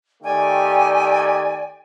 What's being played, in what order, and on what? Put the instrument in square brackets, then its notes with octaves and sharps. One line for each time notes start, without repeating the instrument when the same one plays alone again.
[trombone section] D#3 A3 G4 [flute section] D5 G5 G#5